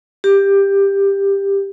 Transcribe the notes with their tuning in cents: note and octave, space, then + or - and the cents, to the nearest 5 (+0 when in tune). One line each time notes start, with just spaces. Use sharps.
G4 +15